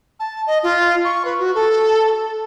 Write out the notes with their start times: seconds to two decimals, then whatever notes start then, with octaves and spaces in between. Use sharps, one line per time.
0.20 A5
0.47 D#5
0.63 F4
1.05 C#6
1.25 B4
1.39 F#4
1.55 A4